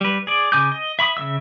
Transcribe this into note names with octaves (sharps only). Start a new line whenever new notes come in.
G3 B4
G#4 D5
C#3 G#5 D6 D#6 G6
D#5
E5 B5 C#6 D#6
C#3 G3 E5 E6